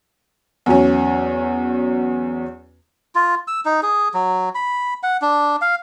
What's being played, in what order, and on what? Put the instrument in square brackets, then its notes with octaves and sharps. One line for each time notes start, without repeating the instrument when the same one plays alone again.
[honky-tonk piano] E2 F#3 C#4
[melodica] F4
E6
D#4
G#4
F#3
B5
F#5
D4
F5